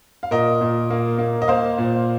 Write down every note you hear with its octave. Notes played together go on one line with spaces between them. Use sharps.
F5
A#2 A#4 D#5
A#2
A#3
A#3
D#5
A#3 C5 F5
A#2